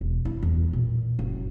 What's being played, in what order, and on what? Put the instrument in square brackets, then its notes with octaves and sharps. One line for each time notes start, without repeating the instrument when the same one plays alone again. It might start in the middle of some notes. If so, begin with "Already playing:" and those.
[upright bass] E1
E4
E2
A#2
F#1